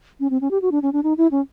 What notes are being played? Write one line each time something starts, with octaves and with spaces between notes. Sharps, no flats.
C#4
C4
C#4
G4
F#4
D4
C#4
D4
D#4
E4
C#4